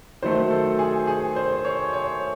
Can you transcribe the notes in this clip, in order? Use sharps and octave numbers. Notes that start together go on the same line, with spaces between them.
D#3 F#3 A3 C5
A4
G#4
G#4
C5
C#5
C#5